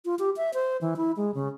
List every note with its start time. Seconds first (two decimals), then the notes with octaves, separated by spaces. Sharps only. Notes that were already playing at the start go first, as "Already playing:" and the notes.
0.05 F4
0.19 G4
0.37 E5
0.54 C5
0.81 E3
0.97 E4
1.17 G#3
1.34 C#3